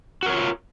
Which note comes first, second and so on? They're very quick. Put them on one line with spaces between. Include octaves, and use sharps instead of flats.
F#4 A#4 C#5 F4